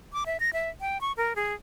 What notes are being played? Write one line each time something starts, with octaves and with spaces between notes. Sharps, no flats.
D6
E5
A#6
E5
G5
C#6
A#4
G#4